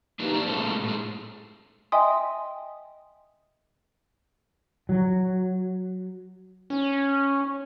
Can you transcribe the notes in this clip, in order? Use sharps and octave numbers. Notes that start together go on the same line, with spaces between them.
A#3 D4 D#4 G4 B4
A#3 C5 D5
A2 G#3 A#3 C#4 A4
A2 G#3
D#5 E5 G5 G#5 C6 D#6
F#3
C#4